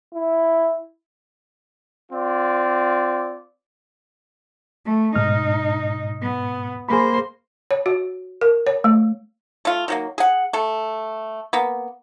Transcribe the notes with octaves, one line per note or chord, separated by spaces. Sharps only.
E4
C4 F4 D5
A3
G#2 B2 D#4 F6
B3
A#3 G#4 C5 B5
C#5
F#4
A#4
C#5
A3
A3 F4
D#3 F#3 A#3
G#4 F#5
A3 A4
A#3 B3